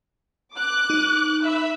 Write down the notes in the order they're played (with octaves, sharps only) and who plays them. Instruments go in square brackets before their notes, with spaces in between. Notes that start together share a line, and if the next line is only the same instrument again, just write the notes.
[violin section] D6 F#6
[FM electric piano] D#4
[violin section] E5 B5